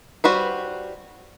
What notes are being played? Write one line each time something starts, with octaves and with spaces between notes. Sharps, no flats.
G3 F#4 B4 C5